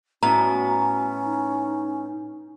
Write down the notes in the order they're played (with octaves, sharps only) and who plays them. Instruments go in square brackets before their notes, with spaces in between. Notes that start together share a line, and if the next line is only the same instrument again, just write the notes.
[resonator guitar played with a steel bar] A2 B3 [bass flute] C#4 [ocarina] F#4 [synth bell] A#5
[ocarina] D#4